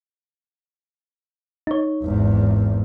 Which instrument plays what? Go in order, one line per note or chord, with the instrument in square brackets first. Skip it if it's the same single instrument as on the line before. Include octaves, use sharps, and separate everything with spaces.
[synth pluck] D#4 C#5
[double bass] G#1 E2